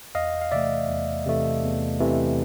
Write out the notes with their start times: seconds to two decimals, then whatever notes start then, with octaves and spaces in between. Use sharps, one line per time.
0.15 E2 D#5 F5
0.41 F5
0.51 C3 E3 A3 D5 E5
0.89 E2
1.26 C3 E3 A3
1.63 E2
2.00 C3 E3 A3